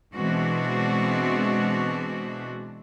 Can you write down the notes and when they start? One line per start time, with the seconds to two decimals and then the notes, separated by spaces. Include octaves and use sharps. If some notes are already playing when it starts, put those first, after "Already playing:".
0.15 B2 E3 G#3 C4 D4 F#4